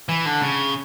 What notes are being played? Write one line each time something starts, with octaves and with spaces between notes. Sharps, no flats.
E3
D3
C#3